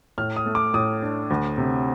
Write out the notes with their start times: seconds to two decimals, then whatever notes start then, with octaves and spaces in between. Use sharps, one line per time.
0.18 A2 F6
0.36 D#6
0.46 A3
0.55 D6
0.74 A2 D#6
1.02 D4
1.30 D2
1.58 C3